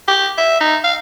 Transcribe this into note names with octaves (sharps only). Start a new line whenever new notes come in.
G4
E5
D#4
F5